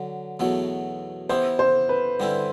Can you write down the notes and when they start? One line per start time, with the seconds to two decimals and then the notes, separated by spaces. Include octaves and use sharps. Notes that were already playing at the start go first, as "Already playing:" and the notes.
Already playing: D3 F#3
0.40 E2 B2 F#3 A3
1.29 E3 B3 E4 G4 C5
1.59 C5
1.89 B4
2.20 G2 D3 G3 C4 E4